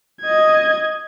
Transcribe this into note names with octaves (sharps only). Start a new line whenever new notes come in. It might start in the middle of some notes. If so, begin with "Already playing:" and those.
D#5 G#6